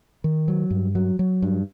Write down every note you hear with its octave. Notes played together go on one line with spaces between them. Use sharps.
D#3
F#3
G2
F#3
F#3
G2